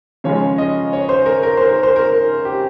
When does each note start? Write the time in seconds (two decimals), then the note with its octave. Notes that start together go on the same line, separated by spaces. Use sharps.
0.24 C#3 F3 G#3 C#5
0.58 D#5
0.93 C#5
1.09 C5
1.26 A#4
1.43 A#4
1.57 C5
1.69 A#4
1.83 C5
1.96 A#4
2.45 G4